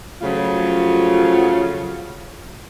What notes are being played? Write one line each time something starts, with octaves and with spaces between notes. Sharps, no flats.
C#3 F3 F#3 A3 F4